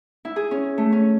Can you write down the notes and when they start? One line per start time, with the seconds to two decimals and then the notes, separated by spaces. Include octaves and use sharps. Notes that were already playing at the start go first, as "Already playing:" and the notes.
0.25 E4
0.36 G#4
0.51 C#4
0.78 A3
0.92 C#4